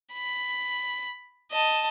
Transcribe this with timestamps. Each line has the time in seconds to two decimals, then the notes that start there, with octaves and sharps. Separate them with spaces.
0.13 B5
1.52 D#5 A5